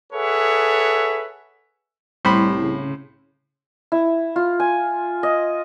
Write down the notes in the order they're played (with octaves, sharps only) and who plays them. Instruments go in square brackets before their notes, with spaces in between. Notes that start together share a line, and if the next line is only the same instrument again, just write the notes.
[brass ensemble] G#4 A4 B4 C#5 E5 F#5
[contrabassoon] C2 [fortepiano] A2 C5 B5 [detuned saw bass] G3
[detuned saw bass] C#3
[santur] E4
F4
G#5
D#5